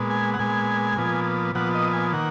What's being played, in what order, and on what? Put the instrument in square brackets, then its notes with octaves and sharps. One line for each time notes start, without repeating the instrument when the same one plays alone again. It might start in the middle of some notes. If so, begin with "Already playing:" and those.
Already playing: [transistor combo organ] A#2 G#3 B3
G#5
F#5
A#2 G#3 B3 G#5
A#2 F3 B3
A#2 F3 B3 F#5
D#5
G#5
D#3 A#3 F#5